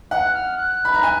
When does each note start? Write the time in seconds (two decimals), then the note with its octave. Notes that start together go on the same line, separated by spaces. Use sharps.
0.11 F#5 F#6
0.34 F6
0.57 F#6
0.85 B5
0.94 A#5
1.03 G#5